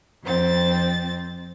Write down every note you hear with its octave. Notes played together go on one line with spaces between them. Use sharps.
F2 C4 A6